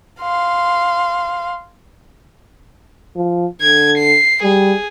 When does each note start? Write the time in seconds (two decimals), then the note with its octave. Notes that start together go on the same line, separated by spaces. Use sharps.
0.21 F5 C6
3.16 F3
3.61 D3 G#6
3.98 C7
4.43 G3 G#4